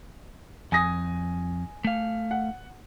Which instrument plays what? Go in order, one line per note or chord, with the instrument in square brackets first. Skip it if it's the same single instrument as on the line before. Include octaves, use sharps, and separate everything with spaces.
[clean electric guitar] F2 [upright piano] G#5 D#6 A#6
[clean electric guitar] A3 F5
[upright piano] F#5